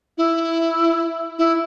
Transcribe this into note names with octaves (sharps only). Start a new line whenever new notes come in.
E4
E4